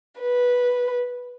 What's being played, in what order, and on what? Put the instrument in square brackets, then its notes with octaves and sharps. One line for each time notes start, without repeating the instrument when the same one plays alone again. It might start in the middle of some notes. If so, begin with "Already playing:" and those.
[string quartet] B4